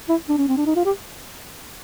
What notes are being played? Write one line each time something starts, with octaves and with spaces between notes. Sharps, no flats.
E4
D4
C#4
C4
D4
D#4
F4
G4